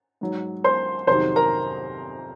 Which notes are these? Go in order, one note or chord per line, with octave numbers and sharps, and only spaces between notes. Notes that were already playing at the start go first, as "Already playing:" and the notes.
G#2 F#3
C5 C6
F2 C3 D#3 F#3 C5 C6
A#4 A#5